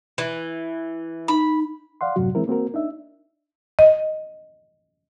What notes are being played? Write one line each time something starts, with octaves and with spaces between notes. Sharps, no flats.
E3
D#4 B5
D5 F5 F#5 C6
F#2 A2 C3 F#3 F#4
E3 G#3 C4 E4 A#4
A#3 C4 F#4 A#4
D4 D#4 E5
D#5